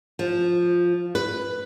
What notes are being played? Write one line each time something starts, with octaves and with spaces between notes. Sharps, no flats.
F3
B4